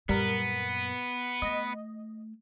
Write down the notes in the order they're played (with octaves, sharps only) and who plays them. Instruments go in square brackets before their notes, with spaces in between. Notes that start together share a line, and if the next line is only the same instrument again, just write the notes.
[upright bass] F#2 A#2 [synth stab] G3 A#4 [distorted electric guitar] B3
[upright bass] A3 [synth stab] D#5